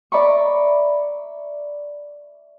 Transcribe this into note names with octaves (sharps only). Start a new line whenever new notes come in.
D5 E5 A#5 B5 C#6